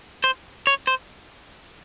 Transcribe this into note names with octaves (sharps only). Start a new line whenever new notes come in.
C5
C#5
C5